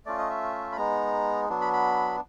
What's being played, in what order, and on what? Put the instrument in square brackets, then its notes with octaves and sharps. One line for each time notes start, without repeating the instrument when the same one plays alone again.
[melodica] A3 C#4 F4 D5
D#5
E5
B5
G#3 B3 D#4 A#5
F#3 B3 D4
B5
B5